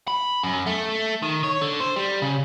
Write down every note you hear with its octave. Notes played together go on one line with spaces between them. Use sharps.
B5
F#2
A3
D#3
C#5
D3
C5
G3
C#3